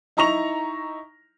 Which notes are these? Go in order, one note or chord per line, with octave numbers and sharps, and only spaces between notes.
D#4 E4 A#5 C#6 A#6 F7